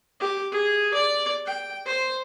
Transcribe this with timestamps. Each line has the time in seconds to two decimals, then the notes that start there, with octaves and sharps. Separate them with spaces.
0.20 G4
0.51 G#4
0.94 D5
1.46 G5
1.86 C5